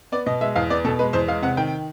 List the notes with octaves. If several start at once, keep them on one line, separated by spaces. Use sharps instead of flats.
B3 D5
B2 D#5
G#3 E5
E2 F5
B3 D5
B2 A4
G#3 B4
E2 C5
G#3 F5
C3 F#5
D#3 G5